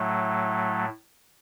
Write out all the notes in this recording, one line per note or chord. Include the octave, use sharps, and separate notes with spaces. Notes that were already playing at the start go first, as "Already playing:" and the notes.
Already playing: A2 F#3 A3